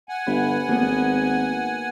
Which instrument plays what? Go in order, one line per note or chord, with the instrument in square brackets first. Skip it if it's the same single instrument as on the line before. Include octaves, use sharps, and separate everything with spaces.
[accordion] F#5 G#5
[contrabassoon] G1 [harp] B4
[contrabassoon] G#1 [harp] A#3 B3